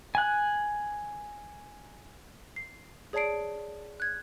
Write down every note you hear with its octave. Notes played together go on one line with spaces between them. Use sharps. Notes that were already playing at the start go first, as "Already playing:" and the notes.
G#5 F#6
C7
G#4 C#5 D5 A5 C7 D7
F#6 G#6